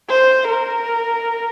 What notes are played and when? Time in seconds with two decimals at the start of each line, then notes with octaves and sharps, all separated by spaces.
0.09 C5
0.48 A#4